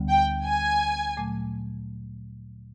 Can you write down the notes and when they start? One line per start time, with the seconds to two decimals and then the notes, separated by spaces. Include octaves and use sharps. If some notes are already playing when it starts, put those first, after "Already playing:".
Already playing: D2 D3 G3 B3
0.09 G5
0.45 G#5
1.17 A#2 F#3 A3